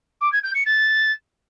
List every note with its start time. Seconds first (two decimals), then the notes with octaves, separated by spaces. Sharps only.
0.21 D6
0.32 G#6
0.43 G6
0.54 C#7
0.66 A6